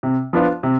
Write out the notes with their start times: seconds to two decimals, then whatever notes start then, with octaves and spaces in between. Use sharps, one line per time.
0.03 C3
0.33 F3 B3 D4 F4
0.63 C3